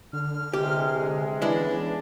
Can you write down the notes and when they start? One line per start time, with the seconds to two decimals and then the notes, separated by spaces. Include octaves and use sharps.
0.13 D3 F6
0.54 C3 E3 G#3 G4
1.42 E3 G#3 B3 C#4 D4 E4 B4